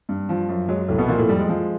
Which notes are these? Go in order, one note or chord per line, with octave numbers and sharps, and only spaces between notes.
G2
F3
F#2
F#3 G#3
C2 A2 A3
B2 B3
A#2 F3 A#3
A2 A3
F2 G3
G#3
F3